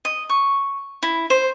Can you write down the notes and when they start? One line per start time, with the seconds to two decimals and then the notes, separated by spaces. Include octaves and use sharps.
0.05 D#5
0.29 C#6
1.03 E4
1.30 C5